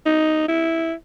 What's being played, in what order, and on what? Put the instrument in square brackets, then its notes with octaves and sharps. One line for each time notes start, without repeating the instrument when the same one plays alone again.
[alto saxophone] D#4
E4